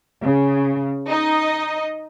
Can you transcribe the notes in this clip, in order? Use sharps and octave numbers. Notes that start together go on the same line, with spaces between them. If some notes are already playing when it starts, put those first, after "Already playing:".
C#3
D#4 D#5